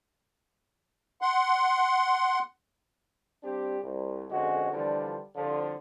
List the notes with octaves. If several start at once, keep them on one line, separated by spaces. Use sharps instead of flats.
F#5 C6
G3 C4 D4 G4
C2
F2 D3 G#3 C#4 F#4
D3 E3 F3 G3 D4 F4
C2 D3 F3